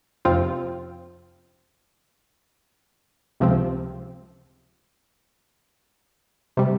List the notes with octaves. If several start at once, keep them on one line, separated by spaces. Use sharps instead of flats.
F2 C3 F3 C4 F4
C#2 C3 F3 C4
C3 G3